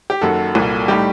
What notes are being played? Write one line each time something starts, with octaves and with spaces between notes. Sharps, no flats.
G4
F#1 F#2 D#3 F#4 A4
C2 A#2 G3
A2 G3 D#4 G4